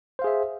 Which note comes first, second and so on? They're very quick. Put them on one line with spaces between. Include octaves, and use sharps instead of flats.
C5 F5 G#4 E5